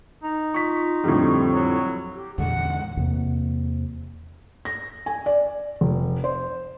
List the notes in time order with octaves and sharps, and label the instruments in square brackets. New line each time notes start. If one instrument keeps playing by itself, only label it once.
[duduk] D#4
[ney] F4 [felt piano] C#6 B6
[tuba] F2 [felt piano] A2 D3 G3
[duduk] F#3
[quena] G4
[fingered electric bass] E2 D3 G#3 [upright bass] A#2 E3 [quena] F#5
[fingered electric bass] E2 C3 A#3
[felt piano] A#6
G#5
D5
F1
C5